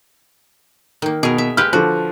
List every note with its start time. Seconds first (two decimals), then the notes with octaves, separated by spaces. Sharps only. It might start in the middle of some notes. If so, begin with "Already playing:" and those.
1.02 D#3 A#3
1.23 B2 G#4 A#4
1.38 E5
1.57 G#3 G4 B4 F6
1.73 D3 F3 F#4